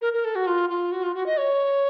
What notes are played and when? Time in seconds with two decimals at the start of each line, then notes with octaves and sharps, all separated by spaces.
0.02 A#4
0.13 A#4
0.25 A4
0.35 F#4
0.47 F4
0.70 F4
0.92 F#4
1.03 F4
1.15 F#4
1.26 D#5
1.37 C#5